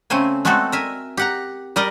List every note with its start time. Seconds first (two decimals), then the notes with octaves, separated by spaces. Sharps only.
0.10 C#3 A3 C4 C5 G#5
0.45 G#3 A3 B3 C4 F#4 A4
0.72 A#4 E5 G#5
1.17 G4 F#5 A#5
1.76 G3 G4 A#4 D5 D#5